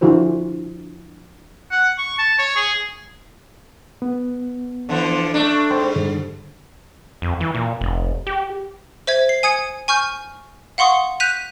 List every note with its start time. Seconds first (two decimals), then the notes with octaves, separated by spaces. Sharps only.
0.01 D3 F3 E4 F#4 C5
1.71 F#5
1.98 C#6
2.18 A5
2.38 C#5
2.56 G#4
4.02 B3
4.89 D3 E3 F3
5.34 A3 D4
5.70 G#2 C5 G5 C6
5.96 G2 D3 G3
7.22 F2
7.40 E3
7.55 A#2
7.81 F1
8.27 G4
9.07 C5 E5 G#6
9.29 C7
9.43 G#5 D#6 G#6 C#7
9.88 G#5 C#6 F6 G6
10.78 F5 F#5 C6 C#6 D#6
11.20 F#6 G6 B6 D#7 F7